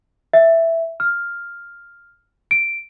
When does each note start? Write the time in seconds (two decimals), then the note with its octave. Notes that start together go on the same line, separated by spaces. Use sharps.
0.33 E5
1.00 F6
2.51 D7